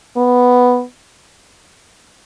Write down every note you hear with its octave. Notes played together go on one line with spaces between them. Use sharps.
B3